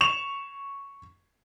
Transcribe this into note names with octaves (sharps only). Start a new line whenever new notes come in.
C#6 E7 F7